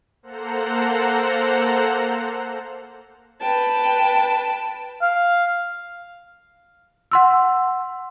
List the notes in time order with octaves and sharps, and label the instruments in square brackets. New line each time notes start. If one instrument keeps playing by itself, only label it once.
[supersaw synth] A#3 A4 C5 F#5 A#5
[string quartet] B4 G5 A5
[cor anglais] F5
[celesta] F#5 C6 E6